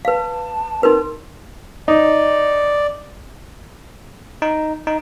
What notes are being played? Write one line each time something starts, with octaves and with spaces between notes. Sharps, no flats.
B4 F5 A5
C4 D#4 A#4 B4
D#4 D5
D#4
D#4